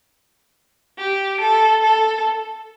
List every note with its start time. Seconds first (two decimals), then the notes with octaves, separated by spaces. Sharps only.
0.98 G4
1.41 A4
1.83 A4